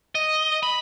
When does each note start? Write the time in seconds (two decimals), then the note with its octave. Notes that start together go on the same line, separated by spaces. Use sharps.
0.15 D#5
0.63 B5